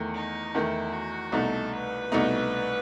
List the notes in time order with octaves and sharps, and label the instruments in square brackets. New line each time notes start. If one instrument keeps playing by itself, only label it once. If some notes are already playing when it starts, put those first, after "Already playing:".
Already playing: [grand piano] E2 D#3 A3
[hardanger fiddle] D#4
[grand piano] E2 D#3 A3 [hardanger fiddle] E4
[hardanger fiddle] F#4
[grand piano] C2 B2 A3 D#4 [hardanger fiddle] A4
[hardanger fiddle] B4
[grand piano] C2 B2 A3 D#4